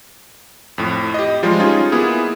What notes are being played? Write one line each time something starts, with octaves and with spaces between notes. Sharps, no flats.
F2 A2
G4 D#5
F3 G3 G#3 F4
C#4 D#4 F4 G#4
A#3 B3 E4 G#4